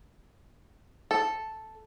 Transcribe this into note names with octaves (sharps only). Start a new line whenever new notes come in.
A4